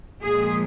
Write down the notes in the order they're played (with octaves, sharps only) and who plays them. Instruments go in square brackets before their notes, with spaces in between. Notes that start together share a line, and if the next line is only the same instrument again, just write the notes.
[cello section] A#2 F3 G#3 G#4